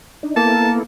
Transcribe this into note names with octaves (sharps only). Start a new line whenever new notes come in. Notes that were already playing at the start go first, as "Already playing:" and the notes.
D4 D#4
A#3 B3 E4 A4 A5